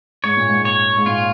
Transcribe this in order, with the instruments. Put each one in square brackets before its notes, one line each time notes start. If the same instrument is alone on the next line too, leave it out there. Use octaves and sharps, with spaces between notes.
[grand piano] G#2 [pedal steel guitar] C#5
[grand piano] A#2
G#2
[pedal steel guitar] C#5
[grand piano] G#2
[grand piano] A#2 [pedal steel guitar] F4